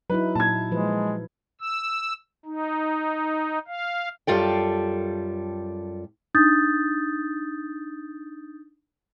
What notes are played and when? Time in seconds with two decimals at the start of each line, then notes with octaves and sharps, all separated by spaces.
0.10 F#3 D#4 E4 B4
0.35 A#2 A5 G#6
0.72 F3 G#3 B4
1.60 E6
2.45 D#4
3.67 F5
4.27 F#2 G3 F4 A4 G5
6.35 D4 D#4 D#6 G6 A6